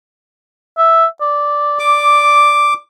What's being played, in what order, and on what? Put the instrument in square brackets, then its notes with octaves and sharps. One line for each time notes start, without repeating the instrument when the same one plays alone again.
[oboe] E5
D5
[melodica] D6